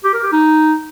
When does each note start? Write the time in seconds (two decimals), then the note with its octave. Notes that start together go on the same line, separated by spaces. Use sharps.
0.04 G4
0.14 A#4
0.23 G4
0.32 D#4